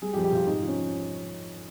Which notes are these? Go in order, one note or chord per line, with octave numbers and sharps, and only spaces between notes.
G3 G#4
G4
F2
G4
C3 F4
G#2 D#4
F3
C#4